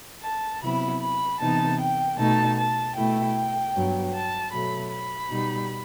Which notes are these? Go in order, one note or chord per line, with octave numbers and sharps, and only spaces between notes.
A5
C3 F#3 B3 E4 B5
B5
C3 E3 B3 D#4 A5
G5
B2 A3 D#4 A5
A5
B2 A3 E4 G5
G2 F#3 B3
A5
B2 F#3 A3 B5
B5
B2 G3 D#4